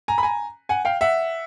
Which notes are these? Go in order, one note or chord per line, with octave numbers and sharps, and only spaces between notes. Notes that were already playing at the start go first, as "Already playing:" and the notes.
G#5 A#5
B5
G#5 A#5
F#5 G#5
F5 G5
E5 F#5